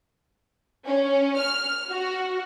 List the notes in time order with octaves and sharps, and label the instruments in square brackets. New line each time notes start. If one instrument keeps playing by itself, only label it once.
[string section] C#4
F6
F#4